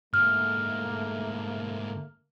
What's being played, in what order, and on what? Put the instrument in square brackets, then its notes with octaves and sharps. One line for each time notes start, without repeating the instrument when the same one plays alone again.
[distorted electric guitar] G#2 D3 [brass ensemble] A3 A#3 [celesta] F6